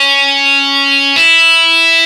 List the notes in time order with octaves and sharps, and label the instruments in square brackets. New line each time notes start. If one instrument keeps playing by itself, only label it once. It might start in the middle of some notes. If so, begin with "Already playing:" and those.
Already playing: [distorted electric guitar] C#4
E4